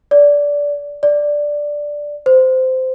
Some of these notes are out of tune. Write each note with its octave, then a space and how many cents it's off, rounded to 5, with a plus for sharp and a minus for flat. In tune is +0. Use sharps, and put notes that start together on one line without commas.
D5 -15
D5 +0
C5 -15